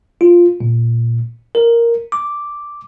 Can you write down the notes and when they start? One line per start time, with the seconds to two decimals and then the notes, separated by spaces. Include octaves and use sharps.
0.21 F4
0.60 A#2
1.55 A#4
2.12 D6